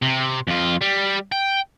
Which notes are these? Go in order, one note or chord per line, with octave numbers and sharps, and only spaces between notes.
C3
F2 F4
G3
G5